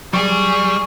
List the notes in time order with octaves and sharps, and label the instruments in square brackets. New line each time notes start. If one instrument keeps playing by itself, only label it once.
[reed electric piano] F#3 [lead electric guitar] G3 [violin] G#4 [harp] C#6